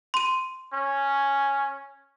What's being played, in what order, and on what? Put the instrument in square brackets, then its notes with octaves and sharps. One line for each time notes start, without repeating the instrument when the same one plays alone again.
[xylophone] C6 D#7
[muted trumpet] C#4